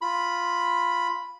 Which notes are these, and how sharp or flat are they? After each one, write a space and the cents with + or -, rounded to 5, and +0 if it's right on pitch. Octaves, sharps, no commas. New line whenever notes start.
F4 +0 B5 +0